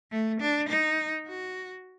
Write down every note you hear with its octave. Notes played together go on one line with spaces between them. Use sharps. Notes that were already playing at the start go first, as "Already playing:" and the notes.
A3
D4
D#4
F#4